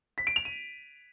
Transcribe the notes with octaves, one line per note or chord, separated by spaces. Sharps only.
B6
D7
F7
D#7